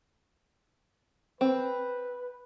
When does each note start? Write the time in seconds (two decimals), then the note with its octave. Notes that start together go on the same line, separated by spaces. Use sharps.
1.41 C4 B4